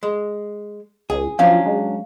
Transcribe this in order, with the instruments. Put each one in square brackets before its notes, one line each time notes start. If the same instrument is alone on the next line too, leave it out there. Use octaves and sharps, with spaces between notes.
[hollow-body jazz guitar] G#3
[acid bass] C#2 [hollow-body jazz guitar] G#4
[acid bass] F3 [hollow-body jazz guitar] F#3 C#4 D4 [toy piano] F5
[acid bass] G#3